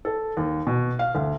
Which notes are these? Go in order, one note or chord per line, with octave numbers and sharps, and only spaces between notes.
A4
D#2
B2
F5
D2